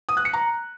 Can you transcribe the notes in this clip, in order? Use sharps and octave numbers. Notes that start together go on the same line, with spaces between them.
D#6
F#6
C#7
A#5